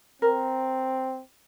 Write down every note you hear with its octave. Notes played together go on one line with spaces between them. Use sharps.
C4 A#4